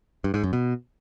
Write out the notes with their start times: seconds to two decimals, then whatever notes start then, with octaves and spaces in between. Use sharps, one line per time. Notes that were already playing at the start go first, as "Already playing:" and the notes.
0.24 G2
0.34 G#2
0.43 F#2
0.53 B2